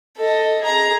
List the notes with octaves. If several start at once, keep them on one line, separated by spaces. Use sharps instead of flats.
A4 D#5
G#4 A#5